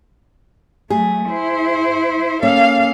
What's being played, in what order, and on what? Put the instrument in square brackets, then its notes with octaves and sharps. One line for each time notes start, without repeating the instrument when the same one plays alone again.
[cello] F#3 A3 [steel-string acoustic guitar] G#4
[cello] E4 C5
[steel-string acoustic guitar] A#3 C#4 [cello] A4 F5